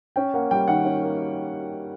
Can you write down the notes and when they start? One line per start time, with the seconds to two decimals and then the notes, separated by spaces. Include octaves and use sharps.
0.16 C#4 G5
0.34 A#3 F#5
0.51 G3 G5
0.68 D#3 F#5
0.85 C#4
1.02 A#3